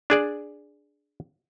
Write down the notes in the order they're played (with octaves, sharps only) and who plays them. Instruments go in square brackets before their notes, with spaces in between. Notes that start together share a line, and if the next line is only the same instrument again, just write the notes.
[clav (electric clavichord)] D4 G#4 D5